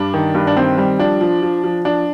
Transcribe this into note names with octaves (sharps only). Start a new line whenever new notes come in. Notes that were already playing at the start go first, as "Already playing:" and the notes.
Already playing: G2 D4
D#3
G2
D4
D#3 C4
G3
F3 D4
F3
F3
F3
F3 D4